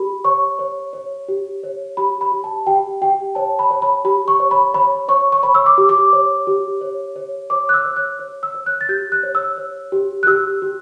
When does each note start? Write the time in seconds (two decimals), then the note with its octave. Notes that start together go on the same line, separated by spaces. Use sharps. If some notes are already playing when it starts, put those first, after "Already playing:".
Already playing: G4 B5
0.25 C#5 C#6
0.59 C#5
0.93 C#5
1.28 G4
1.63 C#5
1.97 G4 B5
2.21 B5
2.32 G4
2.44 A5
2.67 G4 G5
3.02 G4 G5
3.35 C#5 A5
3.59 B5
3.71 C#5
3.82 B5
4.05 G4 B5
4.28 C#6
4.40 C#5
4.51 B5
4.74 C#5 B5
5.08 C#5 C#6
5.32 C#6
5.43 C#5 B5
5.55 E6
5.66 D6
5.78 G4
5.89 D6
6.13 C#5
6.47 G4
6.81 C#5
7.16 C#5
7.50 C#5 D6
7.69 F#6
7.74 E6
7.85 C#5
7.96 F#6
8.19 C#5
8.43 E6
8.54 C#5
8.66 F#6
8.81 A6
8.89 G4 G6
9.12 F#6
9.23 C#5
9.35 E6
9.58 C#5
9.92 G4
10.23 F#6
10.27 G4 E6
10.62 G4